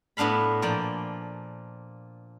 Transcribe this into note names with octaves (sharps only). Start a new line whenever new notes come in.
A2 B3 D4 F5 B5
A#2 F3 D5